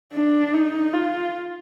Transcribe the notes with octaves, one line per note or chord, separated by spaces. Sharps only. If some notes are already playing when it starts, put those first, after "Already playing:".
D4
D#4
F4